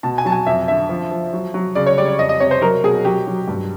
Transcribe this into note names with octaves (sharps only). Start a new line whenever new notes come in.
B2 A5
G#5
F#3 A5
G#5
F2 E5
D3 E5
F3
F3
F#3
F#3
C#3 D5
C#5
G3 D5
D5
F2 D#5
D#5
C3 C#5
C5
F#3 A#4
B2 G#4
F#3 G4
F#3
G2